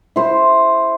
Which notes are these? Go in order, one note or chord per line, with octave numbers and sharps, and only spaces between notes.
E4 C5